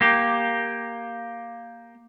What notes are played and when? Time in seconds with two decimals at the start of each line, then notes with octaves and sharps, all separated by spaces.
0.01 A#3 G4